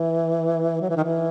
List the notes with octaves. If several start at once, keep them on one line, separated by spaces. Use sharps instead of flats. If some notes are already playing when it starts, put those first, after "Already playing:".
Already playing: E3
F#3
E3
D#3
E3